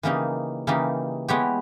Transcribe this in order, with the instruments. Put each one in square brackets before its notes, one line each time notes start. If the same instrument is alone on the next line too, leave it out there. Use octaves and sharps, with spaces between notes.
[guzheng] C#3 E3 A#3 D#4 G4
C#3 E3 A#3 D#4 G4
G#3 B3 E4 G4 C#5